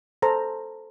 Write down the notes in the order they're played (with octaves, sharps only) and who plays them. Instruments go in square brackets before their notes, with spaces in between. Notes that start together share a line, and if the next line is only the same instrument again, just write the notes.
[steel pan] A4 C5 A#5